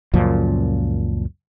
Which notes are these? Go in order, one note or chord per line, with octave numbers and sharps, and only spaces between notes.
C#2 F#2 A#2 F3